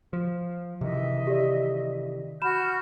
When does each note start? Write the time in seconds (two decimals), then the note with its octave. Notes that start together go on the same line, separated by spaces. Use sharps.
0.13 F3
0.81 C3 D#3 E3 D#5 E5
1.27 G4 D5
2.42 F#4 B5 F6 G6 E7